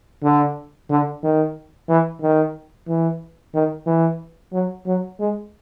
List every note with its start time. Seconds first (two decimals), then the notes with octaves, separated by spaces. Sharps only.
0.23 D3
0.90 D3
1.23 D#3
1.89 E3
2.22 D#3
2.88 E3
3.54 D#3
3.86 E3
4.53 F#3
4.86 F#3
5.19 G#3